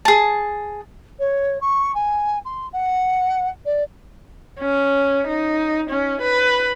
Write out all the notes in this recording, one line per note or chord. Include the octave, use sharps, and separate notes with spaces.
G#4 A5
C#5
C#6
G#5
C6
F#5
D5
C#4
D#4
C#4
B4